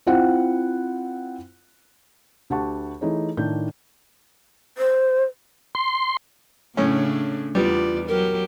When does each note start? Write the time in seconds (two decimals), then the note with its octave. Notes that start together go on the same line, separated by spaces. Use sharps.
0.07 C4 E4 F4 F#5
2.50 D2 G4 F#5 A5 C#6
3.01 E3 A3 D#4 G#4 C#5
3.37 A2 D#3 D4 G6
4.78 C5
5.75 C6
6.77 A2 C#3 A3 C#4 D4
7.55 E2 G3 B3 F4 D5
8.08 F#3 G4 A#4